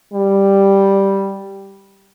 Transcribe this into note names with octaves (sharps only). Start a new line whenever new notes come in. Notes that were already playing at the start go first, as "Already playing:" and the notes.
G3